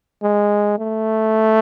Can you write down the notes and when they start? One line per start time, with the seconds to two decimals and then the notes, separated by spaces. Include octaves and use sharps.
0.23 G#3
0.78 A3